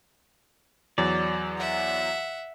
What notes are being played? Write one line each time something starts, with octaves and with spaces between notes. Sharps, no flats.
E2 F#3 D5
E5 F#5